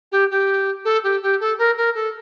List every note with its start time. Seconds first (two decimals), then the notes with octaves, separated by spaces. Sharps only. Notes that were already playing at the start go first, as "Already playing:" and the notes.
0.11 G4
0.30 G4
0.85 A4
1.03 G4
1.22 G4
1.40 A4
1.58 A#4
1.77 A#4
1.94 A4